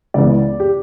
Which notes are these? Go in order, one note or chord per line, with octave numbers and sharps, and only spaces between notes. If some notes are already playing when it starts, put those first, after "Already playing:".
C#2 C#3 E3 B3 D5
G4